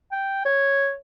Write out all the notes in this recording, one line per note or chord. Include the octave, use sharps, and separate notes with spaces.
G5
C#5